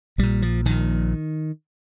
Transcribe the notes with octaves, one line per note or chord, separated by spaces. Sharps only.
A#1 A#2 G3
F3
A#1 A#2 D#3